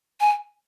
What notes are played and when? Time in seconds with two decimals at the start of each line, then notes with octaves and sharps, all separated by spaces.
0.21 G#5